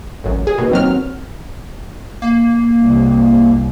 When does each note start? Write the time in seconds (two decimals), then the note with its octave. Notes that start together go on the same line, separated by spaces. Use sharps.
0.24 A1 F#2
0.47 G#4
0.58 D#2 B2
0.72 D#2 F#3 C4 F6
2.22 A#3
2.81 C2